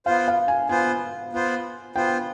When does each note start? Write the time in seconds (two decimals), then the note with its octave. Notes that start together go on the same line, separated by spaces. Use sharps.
0.06 B3 F4 C5 F5
0.28 F5
0.48 G#5
0.69 B3 F4 C5 G#5
1.33 B3 F4 C5
1.96 B3 F4 C5 G5